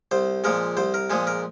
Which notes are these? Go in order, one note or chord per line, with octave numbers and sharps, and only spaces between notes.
C2 C5
A#2 F3 G#3 A#4
C2 C5
A#4
A#2 F3 G#3 G#4
A#4